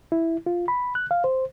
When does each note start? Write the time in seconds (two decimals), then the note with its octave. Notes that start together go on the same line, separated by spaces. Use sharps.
0.12 E4
0.46 F4
0.68 B5
0.95 F#6
1.11 F5
1.24 C5